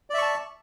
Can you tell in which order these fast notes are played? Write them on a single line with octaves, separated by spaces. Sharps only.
D5 E5 C#6 A5